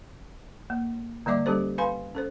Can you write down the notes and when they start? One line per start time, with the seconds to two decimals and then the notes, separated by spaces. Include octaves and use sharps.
0.70 A#3
1.26 D3 G3 A#3 D5 E5 D6
1.46 G3 C#4 G4 A4 C5
1.78 B4 F5 G#5 B5 C6
2.15 C#4 A4 C5